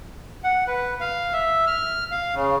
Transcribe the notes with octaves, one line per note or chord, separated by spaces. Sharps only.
F#5
B4
F5
E5
F6
F5
C#3